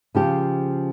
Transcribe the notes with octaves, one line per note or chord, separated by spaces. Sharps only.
C#3 F3 G4